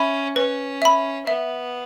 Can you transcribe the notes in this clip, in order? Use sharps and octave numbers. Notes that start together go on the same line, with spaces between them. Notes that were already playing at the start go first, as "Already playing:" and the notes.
Already playing: C#4 E5 B5
C#4 B4
E5 B5
B3 E5